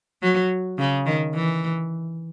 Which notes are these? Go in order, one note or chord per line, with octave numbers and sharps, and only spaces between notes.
F#3
C#3
D#3
E3